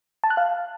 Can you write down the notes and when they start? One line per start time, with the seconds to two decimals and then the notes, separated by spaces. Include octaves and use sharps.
0.24 A5
0.30 F#6
0.37 F5